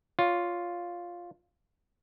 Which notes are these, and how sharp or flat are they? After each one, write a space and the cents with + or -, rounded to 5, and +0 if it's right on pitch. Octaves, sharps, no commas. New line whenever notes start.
F4 +0 C#5 +20